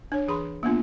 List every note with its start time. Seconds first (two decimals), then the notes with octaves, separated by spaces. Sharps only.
0.12 D4 C#5
0.28 E3 G#4 B5 C6
0.63 A#3 B3 D4 F4